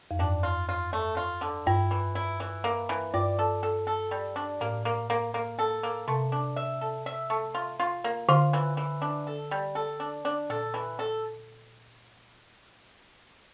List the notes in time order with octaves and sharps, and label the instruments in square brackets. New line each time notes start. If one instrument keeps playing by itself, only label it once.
[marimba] F2
[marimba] G2 [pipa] D4
[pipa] F4
F4
A3
F4
D3
[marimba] G2 [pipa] E4
[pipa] E3
E4
E3
A#3
E3
[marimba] G2 [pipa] D5
[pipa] A4
A4
A4
G3
D4
[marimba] A2 [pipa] A#3
[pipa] A#3
A#3
A#3
A4
A#3
[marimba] C3 [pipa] A3
[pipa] D4
E5
A4
E5
A3
F4
F4
A#3
[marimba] D3 [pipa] F4
[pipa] E3
E3
D4
A4
G3
A4
D4
D4
[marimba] A#2 [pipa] A4
[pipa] E3
A4